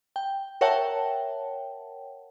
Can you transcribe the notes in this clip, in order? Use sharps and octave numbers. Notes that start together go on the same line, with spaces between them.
G5
A#4 C#5 E5 F#5 G5 A5